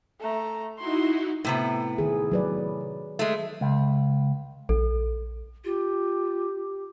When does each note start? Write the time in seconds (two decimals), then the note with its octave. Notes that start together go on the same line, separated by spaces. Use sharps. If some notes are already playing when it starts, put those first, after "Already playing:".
0.20 A3 A#5
0.78 D#4 E4 F#4 C6
1.45 A2 C3 B3
1.98 D#3 G#4
2.32 F#3 B4 D5
3.19 G#3 A3
3.61 C#2
4.69 A#1 A4
5.65 F4 G4